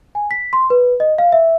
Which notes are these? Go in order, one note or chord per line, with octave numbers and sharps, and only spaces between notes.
G#5
B6
C6
B4
D#5
F5
E5